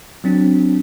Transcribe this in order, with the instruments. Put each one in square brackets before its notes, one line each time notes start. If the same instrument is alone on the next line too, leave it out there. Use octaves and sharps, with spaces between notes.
[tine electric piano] F#3 C4 D4